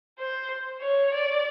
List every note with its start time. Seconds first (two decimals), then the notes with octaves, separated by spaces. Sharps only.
0.19 C5
0.81 C#5
1.14 D5